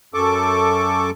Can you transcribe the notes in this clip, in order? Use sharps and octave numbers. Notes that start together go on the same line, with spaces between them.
F#2 A4 C#6 D6